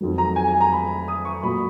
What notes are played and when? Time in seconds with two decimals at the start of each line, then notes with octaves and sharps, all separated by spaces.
0.01 F2 D#3 F#3
0.18 A#5
0.36 G#5
0.48 G#5
0.61 A#5
0.72 B5
1.08 D#6
1.25 C#6
1.43 A#2 F#3 B5